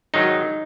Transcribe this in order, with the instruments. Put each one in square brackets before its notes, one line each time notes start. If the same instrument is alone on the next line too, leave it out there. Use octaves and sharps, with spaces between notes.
[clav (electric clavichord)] G#2 D#3 F#3 D#4